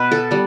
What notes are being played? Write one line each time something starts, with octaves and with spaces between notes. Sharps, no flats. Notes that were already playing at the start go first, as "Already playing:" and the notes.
Already playing: B2 B3 B4
A4
G3 B3